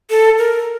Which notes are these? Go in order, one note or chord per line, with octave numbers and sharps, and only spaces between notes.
A4
A#4